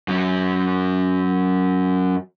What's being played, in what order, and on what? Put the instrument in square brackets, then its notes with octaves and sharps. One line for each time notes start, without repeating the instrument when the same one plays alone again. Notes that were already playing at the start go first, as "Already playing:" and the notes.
[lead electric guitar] F#2 F#3